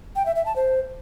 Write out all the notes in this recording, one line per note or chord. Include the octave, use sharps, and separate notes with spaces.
G5
E5
E5
A5
C5